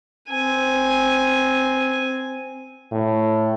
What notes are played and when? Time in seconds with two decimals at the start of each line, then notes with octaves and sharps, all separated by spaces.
0.30 C4 G#5
2.92 A2